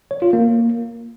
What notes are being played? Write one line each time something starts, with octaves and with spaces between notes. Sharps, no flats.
C#5
F4
A#3